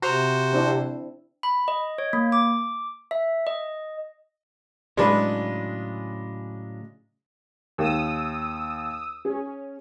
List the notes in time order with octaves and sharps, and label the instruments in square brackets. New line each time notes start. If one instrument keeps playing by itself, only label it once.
[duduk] C3 [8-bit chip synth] F#4 C5 [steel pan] A#5
[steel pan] C4 D4 E4
[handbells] B5
D#5
C#5
A#3
D6
E5
D#5
[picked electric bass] A2 C#3 F#3 [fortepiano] G#3 D4 B4
[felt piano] D#2 [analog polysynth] D#6 E6
[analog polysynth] C#4 [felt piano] G#4